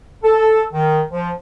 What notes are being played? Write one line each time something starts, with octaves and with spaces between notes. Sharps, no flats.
A4
D#3
F3